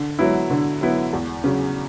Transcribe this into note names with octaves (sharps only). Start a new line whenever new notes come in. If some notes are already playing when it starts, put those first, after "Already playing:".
Already playing: D3
F#3 B3 E4
D3
F#3 B3 E4
E2
C#3 F#3